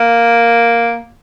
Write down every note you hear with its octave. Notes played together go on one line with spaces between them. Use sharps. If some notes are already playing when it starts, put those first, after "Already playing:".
Already playing: A#3